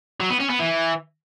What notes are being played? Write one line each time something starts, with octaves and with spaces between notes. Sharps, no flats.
F#3
B3
C#4
B3
E3